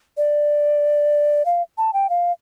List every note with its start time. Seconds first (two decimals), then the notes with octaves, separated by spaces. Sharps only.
0.17 D5
1.45 F5
1.78 A5
1.93 G5
2.10 F5